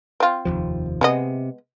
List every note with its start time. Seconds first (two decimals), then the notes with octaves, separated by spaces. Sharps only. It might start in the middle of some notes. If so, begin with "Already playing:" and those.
0.20 C4 F4
0.45 F1 D#2 F3
1.01 C3 G#3 B3 D#5